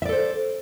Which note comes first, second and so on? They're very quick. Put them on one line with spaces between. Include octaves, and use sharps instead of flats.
E5 D5 A4 C5